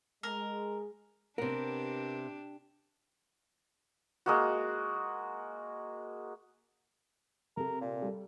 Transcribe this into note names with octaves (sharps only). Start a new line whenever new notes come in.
G#3 A#4
C3 B3 D4 G4 A#4
G#3 A#3 F#4
C3 A4 A#4
A#2
G3 A4